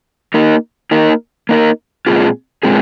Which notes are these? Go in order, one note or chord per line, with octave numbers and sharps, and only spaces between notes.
A#3 D#4 A#4
A#3 D#4 A#4
A#3 D#4 A#4
A#2 G#3 C4 F4 G#4
A#2 G#3 C4 F4 G#4